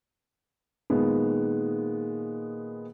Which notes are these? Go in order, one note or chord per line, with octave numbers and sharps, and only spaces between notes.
A#2 D#3 G#3 B3